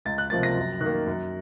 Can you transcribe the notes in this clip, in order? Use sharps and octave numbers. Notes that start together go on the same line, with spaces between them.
C#2 A6
F#6
C3 F3 A#3 A6
A#6
F#2
D#3 F#6
A#3
F#2